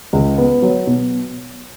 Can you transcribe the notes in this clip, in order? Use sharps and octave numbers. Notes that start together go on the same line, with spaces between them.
C#2
B3
F#3
B2